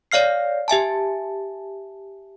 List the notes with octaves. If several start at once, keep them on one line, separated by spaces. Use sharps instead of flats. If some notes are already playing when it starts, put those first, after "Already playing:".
C#5 D5 F5 F6 C7
G4 E5 G#5 A5